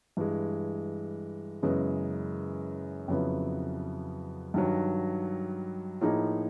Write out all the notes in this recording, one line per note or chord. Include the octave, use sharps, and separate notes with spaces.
G2 E3 G#3
F#2 C#3 E3 G#3 B3
F2 C#3 F#3 B3 E4
G2 D#3 F#3
A2 F3 A#3 D#4 G#4